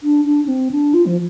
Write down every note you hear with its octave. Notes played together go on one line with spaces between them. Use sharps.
D4
D4
D4
C4
D4
F4
F3